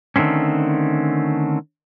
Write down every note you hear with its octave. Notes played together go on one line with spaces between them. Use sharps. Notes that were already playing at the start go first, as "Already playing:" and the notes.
D3 D#3 A3 C4 C#4